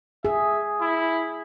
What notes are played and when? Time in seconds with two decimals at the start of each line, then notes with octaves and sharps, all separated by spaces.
0.25 G#4 E5
0.81 E4